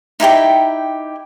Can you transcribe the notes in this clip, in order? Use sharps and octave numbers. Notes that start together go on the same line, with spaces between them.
D#4 E4 G4 G5